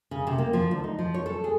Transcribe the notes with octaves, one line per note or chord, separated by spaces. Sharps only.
C#3
C3
A#3
F3
D2
D#4
F3
C#5
A4
G#4